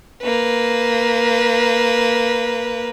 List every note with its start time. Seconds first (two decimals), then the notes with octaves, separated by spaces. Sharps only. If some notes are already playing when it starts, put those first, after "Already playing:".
0.22 A#3 B4